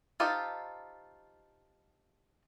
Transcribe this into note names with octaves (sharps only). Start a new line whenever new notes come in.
D#4 F4 G4 A4 C5